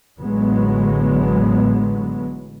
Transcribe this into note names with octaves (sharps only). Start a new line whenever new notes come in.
A1 D3 F#3 G#3 B3